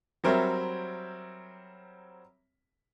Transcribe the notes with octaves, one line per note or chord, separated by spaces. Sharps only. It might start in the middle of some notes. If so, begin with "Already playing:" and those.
F#3 G3 C4 A#4 C#5 E5